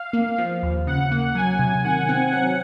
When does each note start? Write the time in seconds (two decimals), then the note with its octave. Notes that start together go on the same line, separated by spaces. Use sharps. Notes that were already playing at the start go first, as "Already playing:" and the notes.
Already playing: F5
0.13 A#3
0.38 F3
0.63 D#2
0.87 C#3 F#5
1.12 A#3
1.35 F#3 G#5
1.59 C3
1.84 D#3 F#5
2.09 C4
2.33 F#3 F#5